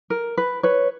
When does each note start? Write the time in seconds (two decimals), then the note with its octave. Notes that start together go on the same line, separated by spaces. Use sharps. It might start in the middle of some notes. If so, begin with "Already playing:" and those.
0.10 A#4
0.37 B4
0.63 B4 C#5